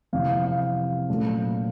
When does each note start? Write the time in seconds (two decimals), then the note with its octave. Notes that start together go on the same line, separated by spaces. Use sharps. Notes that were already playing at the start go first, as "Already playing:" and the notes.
0.13 F2 C3 E3 F5
0.29 F5
0.45 F5
0.60 F5
1.08 A#2 F#3 A3 C#4